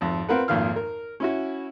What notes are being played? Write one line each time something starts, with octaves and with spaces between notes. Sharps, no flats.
G#1 F2
C4 F4 A#4 B4 F#5
G#1 F2 A#2 D#3 F5 F6
A#4
C#4 E4 F#4